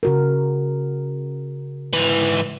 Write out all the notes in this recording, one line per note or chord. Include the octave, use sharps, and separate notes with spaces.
C#3 F#4 A#4
G#2 E3